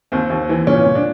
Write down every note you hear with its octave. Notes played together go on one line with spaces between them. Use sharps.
D#2 C4
D#2
E3
A#2 C#4
A#2
D4